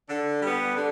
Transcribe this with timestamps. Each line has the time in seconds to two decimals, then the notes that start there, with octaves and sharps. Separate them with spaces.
0.09 D3
0.42 G3 B3
0.75 D3